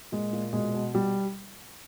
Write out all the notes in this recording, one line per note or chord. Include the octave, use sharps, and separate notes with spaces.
A#2 G#3
A#2
B2 G#3
B2
B2 G3